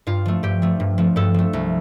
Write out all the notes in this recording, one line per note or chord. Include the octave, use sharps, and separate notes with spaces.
G2 F4
F3 A3
G2 G4
F3 A3
G2
F3 A3
G2 A4
F3 A3
C2